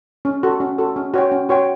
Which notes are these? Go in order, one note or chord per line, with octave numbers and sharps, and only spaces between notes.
C#4
F#4 A4
C#4
F#4 A4
C#4
F#4 C#5 G5
C#4
F#4 C#5 G5